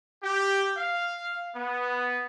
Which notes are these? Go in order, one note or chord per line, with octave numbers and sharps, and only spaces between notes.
G4
F5
B3